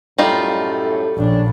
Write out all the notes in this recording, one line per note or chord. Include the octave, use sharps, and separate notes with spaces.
F#2 A2 G3 D#4 F4 A4
A#1 C#4 D4